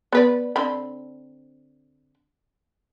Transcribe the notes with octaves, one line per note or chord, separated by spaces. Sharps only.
B3 B4 D5
D3 C4 B5